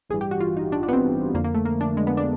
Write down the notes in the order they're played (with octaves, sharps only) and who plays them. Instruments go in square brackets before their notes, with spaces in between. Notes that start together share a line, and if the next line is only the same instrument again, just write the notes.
[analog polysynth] A1 G2 E3 G3 G#4
G4
F#4
F4
D#4
D4
D4
B3
C4
F2 D3 F3 A#3
A#3
A3
A#3
D4
G#3
B3
D4